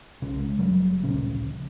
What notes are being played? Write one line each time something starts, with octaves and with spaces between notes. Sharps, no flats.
C2 C#3 G#3 C#4
F#1 F#2 F#3 G3
D1 A#1 C#3 C#4